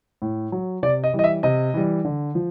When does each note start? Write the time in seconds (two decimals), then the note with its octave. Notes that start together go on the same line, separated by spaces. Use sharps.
0.22 A2
0.52 F#3
0.83 C3 D5
1.04 D#5
1.13 E3 G3
1.19 D#5
1.24 E5
1.43 C3 D#5
1.74 E3 G3
2.05 D3
2.35 F3